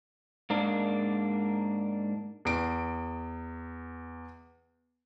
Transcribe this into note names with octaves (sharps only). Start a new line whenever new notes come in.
G#2 A#3 D4
E2 D7